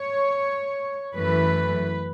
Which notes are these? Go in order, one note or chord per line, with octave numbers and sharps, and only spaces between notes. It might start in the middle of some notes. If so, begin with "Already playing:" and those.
Already playing: C#5
F#2 E3 A3 B4